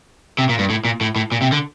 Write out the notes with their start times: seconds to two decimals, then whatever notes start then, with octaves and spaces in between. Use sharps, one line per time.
0.39 C3
0.49 A#2
0.59 G2
0.70 A2
0.85 A#2
1.01 A2
1.16 A2
1.32 A#2
1.42 C3
1.52 D3